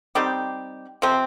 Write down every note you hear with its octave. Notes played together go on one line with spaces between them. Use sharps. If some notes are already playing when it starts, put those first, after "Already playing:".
G3 C4 D#4 G4
C3 F3 C4